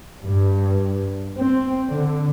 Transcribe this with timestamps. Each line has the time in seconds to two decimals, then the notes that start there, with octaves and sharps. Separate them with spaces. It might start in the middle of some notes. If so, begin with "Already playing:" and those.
0.24 G2
1.38 C4
1.91 D3